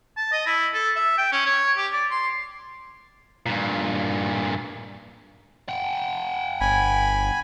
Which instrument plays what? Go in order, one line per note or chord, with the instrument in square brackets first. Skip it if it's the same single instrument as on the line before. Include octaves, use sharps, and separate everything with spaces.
[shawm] A5
D#5
E4
A4
E5
G5
C#4
C#5
G4
D5
C6
[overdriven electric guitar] G2 A#2
F#5 G5
[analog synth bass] G1 [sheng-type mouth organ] G#5 B5